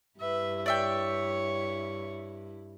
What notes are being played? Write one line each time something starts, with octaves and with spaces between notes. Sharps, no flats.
G2 E4 B4 E5
C#5 D5 E5 G5